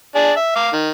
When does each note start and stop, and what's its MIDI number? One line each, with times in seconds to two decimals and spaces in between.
0.15 0.32 62
0.15 0.32 68
0.15 0.32 74
0.36 0.55 76
0.56 0.69 77
0.56 0.69 86
0.73 0.91 51